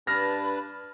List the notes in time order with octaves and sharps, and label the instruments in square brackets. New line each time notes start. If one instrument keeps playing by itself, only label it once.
[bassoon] G2 [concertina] D4 B4 A5 [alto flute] B5 [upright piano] F6 A#6